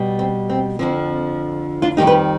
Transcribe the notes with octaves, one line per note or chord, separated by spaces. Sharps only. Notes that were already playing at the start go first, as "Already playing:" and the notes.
Already playing: B2 G3
C4
C4
F2 D3 F3 C4
D4 F4
F2 D#3 G3 D#4 G4
G4 B4